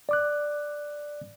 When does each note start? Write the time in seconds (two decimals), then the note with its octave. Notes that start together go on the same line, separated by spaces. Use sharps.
0.09 D5 D6 F#6